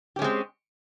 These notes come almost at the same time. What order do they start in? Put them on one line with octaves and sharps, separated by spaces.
G4 C#4 G#3 C4